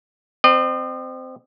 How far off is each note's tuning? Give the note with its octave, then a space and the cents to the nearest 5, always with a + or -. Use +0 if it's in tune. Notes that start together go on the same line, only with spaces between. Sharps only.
C4 -15 D#5 -40